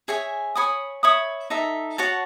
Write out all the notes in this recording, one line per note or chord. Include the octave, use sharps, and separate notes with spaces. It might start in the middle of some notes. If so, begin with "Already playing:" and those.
G#4 C#5 E5 G#5
C#5 G#5 B5 D#6
C#5 E5 B5 D#6
D#4 A4 E5
F#4 C#5 F#5 A5